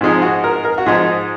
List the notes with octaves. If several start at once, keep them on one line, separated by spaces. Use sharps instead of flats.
G#2 F3 G#3 D#4
F#4
A#4
A#4
F#4
G#2 F3 G#3 D#4 G#4